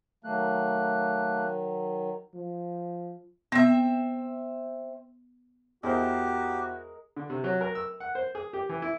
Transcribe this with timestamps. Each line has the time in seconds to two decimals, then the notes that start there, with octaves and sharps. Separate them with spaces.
0.24 D#3 F#3 A3 A#3 F#6
2.35 F3
3.52 B3 C4 E5
5.83 E2 G#3 F#4 G4 A#4 C5
7.17 D3
7.30 C3
7.44 F#3
7.61 A#4
7.75 E6
8.00 F#5
8.15 C5
8.35 G#4
8.53 G4
8.69 E3
8.82 E4